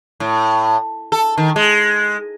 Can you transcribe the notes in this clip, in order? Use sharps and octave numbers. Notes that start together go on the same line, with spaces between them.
A2
A4
D#3
G#3